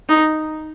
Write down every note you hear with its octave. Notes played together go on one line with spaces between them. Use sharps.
D#4